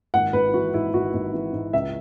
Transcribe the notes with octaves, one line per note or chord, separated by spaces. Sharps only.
G#1 F#5
G#1 B4
E3 F#4
G#2 E4
G#1 F#4
G#1
E3
G#2
C#2 E5